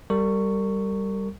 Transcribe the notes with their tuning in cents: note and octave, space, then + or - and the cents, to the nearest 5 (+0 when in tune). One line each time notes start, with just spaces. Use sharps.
G3 +0 A#4 -35 C#6 +0